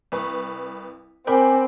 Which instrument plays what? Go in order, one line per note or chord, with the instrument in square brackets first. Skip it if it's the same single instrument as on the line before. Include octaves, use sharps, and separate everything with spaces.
[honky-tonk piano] C2 B4 C#6
[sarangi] C4 [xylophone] A#4 [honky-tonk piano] G5 B5 D6 [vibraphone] G#5